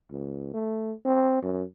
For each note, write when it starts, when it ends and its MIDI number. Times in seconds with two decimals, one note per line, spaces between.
0.12 0.51 37
0.54 0.93 57
1.06 1.40 60
1.42 1.64 42